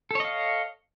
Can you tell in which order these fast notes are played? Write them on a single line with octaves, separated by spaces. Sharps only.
A4 C#5 D#5 F5